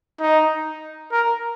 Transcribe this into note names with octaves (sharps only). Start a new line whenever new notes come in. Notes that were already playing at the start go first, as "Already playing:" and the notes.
D#4
A#4